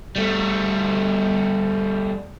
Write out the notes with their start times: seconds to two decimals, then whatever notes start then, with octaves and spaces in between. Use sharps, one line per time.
0.16 G3 A3